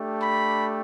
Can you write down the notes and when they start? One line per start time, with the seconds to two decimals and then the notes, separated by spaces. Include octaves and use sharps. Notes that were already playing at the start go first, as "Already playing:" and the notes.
Already playing: A3 D4 G4
0.20 B5